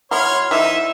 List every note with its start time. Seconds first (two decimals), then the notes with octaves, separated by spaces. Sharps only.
0.11 F#3 E4 C#5 C6 F6
0.51 E3 D#4 E5